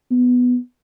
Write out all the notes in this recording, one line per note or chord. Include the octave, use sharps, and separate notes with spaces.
B3